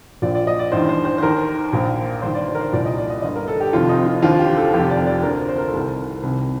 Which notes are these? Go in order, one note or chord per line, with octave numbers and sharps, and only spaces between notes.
A#1 A#2 F3 D5
D5
D#5
D5
A1 G2 D#3 C5
C5
C5
C5
D#2 D#3 A#4
A#1 A#2 F3
G1 G2 D#3 C5
D5
C5
A#4
C5
C2 A#2 F3 D5
D#5
D5
D#5
G1 G2 D3 D#5
A#4
A4
G4
F1 F2 C3 D#3 F4
D#4
F4
D#2 D3 F3 F4
G4
A4
F1 F2 C3 F3 G4
D5
D5
D2 D3 F3 A#4
C5
A#4
A4
C2 C3 D#3 A#4
C2 C3 D#3